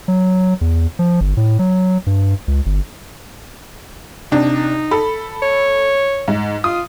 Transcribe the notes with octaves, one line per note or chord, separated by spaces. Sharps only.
F#3
E2
F3
G1
A2
F#3
G2
C#2
G1
C3 D4 D#4
A4 B5
C#5
G#2
F4 D#6